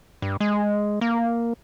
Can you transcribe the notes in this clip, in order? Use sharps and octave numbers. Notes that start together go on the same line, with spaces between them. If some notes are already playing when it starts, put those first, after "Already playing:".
G2
G#3
A#3